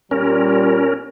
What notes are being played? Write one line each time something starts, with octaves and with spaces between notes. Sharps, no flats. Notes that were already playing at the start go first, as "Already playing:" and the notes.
A#2 G3 C#4 A#4